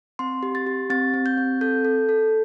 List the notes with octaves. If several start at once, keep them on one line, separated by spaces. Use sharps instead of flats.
C4 C6
G4
A6
G4
C4 A6
C4
G6
C4
A4 G6
A4
A4